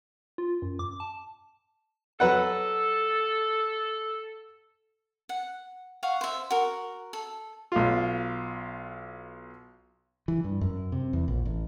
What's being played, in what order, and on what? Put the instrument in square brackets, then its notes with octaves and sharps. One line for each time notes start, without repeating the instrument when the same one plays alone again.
[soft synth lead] F4
F#2
D6
A5
[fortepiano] F#3 B4 F#5 [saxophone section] A4
[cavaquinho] F#5
F5 F#5 C#6
C5 E5
F#4 A#4
A4
[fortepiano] B1 F4
[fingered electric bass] E3
G2
F#2
C3
E2
A#1
A1